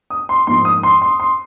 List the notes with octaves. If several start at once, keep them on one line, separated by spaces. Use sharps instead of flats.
D#6
C6
G#2 F3 A#3 F4 C6
D#6
C6
C6
C6